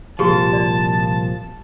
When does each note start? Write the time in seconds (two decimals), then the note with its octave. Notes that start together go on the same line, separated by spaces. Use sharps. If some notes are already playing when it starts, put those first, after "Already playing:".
0.19 C2 A#2 F3 F#4 G4 A5
0.53 D5